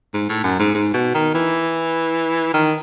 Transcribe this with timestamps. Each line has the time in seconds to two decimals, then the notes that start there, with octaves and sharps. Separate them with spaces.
0.14 G#2
0.29 A2
0.44 F#2
0.59 G#2
0.74 G#2
0.94 B2
1.15 D#3
1.35 E3
2.54 D#3